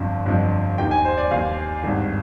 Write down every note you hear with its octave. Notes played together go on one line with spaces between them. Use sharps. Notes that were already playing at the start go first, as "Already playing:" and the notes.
Already playing: G1 F2 D3 F3
G1 F2 D3 F3
D#2 D#3 G5
G#5
C5
D5
D#2 D#3 F5
G#1 G2 D#3